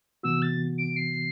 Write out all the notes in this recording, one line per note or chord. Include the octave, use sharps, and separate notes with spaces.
C3 E3 B3 F#4 E6
A6
D7
C7